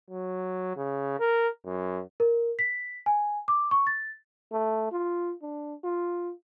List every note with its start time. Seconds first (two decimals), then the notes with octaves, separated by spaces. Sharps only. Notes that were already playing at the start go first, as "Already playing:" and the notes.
0.10 F#3
0.76 C#3
1.19 A#4
1.65 F#2
2.20 A#4
2.59 B6
3.06 G#5
3.48 D6
3.71 C#6
3.87 A6
4.52 A3
4.91 F4
5.42 D4
5.84 F4